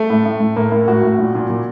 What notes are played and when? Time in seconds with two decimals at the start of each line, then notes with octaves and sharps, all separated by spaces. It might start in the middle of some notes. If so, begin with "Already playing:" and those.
Already playing: A3
0.10 A2
0.26 A2
0.40 A2
0.56 A2 A#3
0.72 A2
0.88 A2 F#4
1.03 A2
1.19 A#2
1.35 A#2
1.50 A#2